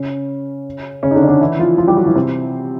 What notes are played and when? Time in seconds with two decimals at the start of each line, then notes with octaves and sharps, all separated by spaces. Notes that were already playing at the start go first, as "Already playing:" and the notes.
Already playing: C#3 C#4
1.03 C#3 C#4
1.11 D#4
1.15 D3 D4
1.23 C#4
1.28 D3 D4
1.40 E3 E4
1.59 F3 F4
1.78 F3 F4
1.87 G3 G4
1.97 F#3 F#4
2.06 E3 E4
2.16 C3 C4